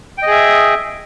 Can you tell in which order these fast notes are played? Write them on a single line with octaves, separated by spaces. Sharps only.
G5 D#5 G#4 E5